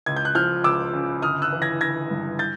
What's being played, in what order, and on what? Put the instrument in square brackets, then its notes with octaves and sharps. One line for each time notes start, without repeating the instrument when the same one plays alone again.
[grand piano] C#2 G#6
G6
F#6
F3 F6 G6
C#2 D6 E6
C#3
G1 D#6 F6
E6 F#6
E3
G#6 A#6
G1 G#6 A#6
G2
G6 A6